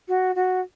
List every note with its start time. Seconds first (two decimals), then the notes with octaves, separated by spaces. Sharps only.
0.08 F#4
0.35 F#4